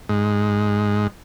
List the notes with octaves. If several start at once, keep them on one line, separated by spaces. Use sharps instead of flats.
G#2